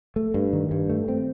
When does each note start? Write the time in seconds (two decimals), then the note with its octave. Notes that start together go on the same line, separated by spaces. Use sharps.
0.16 A3
0.34 G2
0.53 D#3
0.71 G2
0.89 A3
1.08 C4